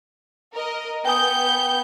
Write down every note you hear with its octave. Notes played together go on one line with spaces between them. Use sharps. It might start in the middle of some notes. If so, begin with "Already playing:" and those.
A#4 D#5
B3 G5 G#5 D#6 G6